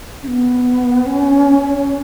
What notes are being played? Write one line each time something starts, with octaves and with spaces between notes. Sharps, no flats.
C#4
B3
C#4